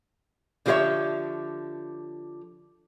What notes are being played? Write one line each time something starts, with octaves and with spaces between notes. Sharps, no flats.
D3 F3 G4 C5 C#5 E5